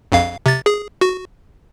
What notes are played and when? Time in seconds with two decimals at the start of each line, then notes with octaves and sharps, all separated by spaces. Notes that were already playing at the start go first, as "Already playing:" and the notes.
0.12 A#1 F2 F5
0.46 C3 A6
0.66 G#4
1.01 F#4